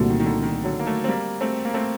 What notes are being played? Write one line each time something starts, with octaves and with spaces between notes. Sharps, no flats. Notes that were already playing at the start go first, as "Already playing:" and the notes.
Already playing: C2 A#2 D3 A3 C4 F#4
D#3
D#3
D3
D#3
D3 F#3
A#3
F#3 A3
C4
G3 A#3
A3 C4
A#3
A3 C4